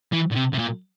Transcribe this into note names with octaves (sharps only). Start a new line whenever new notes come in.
E3
A#2
C3
C3
A#2